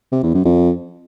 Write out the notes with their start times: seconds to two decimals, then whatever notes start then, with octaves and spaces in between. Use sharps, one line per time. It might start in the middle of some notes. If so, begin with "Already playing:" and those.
0.12 C3
0.23 E2
0.34 F#2
0.45 F2